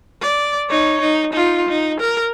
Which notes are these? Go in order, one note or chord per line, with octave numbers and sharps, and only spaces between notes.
D5
D#4 C#5
D#4
D#4 F4
D#4
A#4